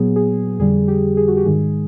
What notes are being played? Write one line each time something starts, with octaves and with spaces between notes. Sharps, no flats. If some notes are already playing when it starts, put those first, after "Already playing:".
Already playing: A#2 F#3 B3 G#4
G#4
F2 D3 G3 G#4
G4
G#4
F#4
G4
G#2 D#3 G#3 G#4